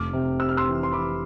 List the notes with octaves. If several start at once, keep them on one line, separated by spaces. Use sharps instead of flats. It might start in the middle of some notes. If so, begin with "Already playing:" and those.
Already playing: F1 D6 F6
C3
C3 E6
F6
C6 E6
E3
C6
E3 B5 D6